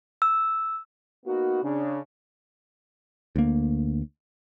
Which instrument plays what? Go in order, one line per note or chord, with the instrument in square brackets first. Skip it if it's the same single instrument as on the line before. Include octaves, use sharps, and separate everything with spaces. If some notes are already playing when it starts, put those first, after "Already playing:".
[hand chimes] E6
[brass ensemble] A#3 B3 D#4 F#4
C#3 D4
[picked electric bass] D2 A#3